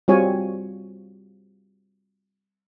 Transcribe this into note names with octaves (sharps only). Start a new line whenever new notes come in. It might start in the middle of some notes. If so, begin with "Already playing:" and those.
G3 C4 F4 F#4 C#5 G#5